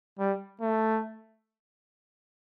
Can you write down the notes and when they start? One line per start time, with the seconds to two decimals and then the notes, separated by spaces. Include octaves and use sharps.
0.19 G3
0.61 A3